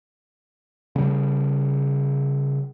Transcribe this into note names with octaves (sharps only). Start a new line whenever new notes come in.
C#3 G3